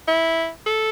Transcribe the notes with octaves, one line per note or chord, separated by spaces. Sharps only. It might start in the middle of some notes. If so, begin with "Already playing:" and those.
E4
A4